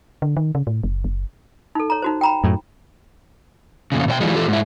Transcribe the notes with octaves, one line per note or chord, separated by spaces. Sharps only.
D3
D#3
C#3
A2
F#1
F#1
D#4 A4
C#5 A#5
D#4 F#4 C5
G5 A#5 B5
F#2 A2
F2 A#2 C#3
B2 C#5 G5
E3 F3 G3 G#3
E3 F4 G4 A4
G#2 E4